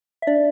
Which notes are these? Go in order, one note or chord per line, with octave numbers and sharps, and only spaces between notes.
E5
D4 D5